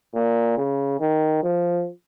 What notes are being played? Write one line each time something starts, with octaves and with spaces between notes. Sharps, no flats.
A#2
C#3
D#3
F3